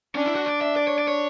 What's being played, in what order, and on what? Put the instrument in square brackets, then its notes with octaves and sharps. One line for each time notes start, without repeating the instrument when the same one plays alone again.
[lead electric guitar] C#4 [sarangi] D4
[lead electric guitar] E4
F#4
D5
E5
D5
C#5
D5
C#5